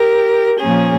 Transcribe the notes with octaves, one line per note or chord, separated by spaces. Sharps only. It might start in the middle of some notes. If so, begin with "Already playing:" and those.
Already playing: G4 A#4
A#2 F3 A#3 C#4 G#4